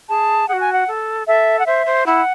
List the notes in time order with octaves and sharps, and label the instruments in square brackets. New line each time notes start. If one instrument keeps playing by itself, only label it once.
[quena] G#4 [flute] A5
[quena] F#4 G#4 [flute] F#5
[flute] G#5
F#5
[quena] A4
[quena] A4 [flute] E5
[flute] F#5
[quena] C5 [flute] E5
[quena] C5
[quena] E4 [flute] F#5